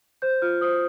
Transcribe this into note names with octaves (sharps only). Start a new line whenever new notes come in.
C5 G6
F4 F6
C5 D#6